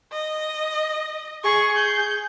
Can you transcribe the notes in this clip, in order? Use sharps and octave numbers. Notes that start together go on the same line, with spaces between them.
D#5
G#4 C#6
G6